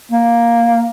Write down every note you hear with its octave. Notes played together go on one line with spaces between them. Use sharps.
A#3